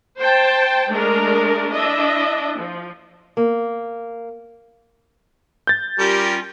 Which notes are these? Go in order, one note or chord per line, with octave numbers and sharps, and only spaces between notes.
C5 G5 A5
G#3 A3 D4 G#4 A#4
D4 E4 D#5 E5
F3
A#3
G6 A6
G3 C#4 F4 G4 A#4